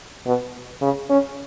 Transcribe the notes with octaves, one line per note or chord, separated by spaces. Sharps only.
B2
C#3
C#4